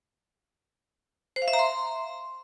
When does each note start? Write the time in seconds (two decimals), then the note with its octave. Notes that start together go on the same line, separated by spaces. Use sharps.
1.36 C5
1.42 F5
1.48 E5
1.53 A#5
1.59 C6